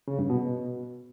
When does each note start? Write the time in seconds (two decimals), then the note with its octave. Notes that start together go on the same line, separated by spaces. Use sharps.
0.08 C#3
0.19 G2
0.30 B2